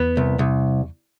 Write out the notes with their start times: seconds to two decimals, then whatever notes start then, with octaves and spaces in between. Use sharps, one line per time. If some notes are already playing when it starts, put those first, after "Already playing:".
Already playing: E2 B3
0.17 C2
0.39 C2